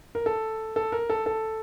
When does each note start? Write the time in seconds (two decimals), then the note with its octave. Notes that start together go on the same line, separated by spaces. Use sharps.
0.15 A#4
0.26 A4
0.76 A4
0.92 A#4
1.10 A4
1.26 A4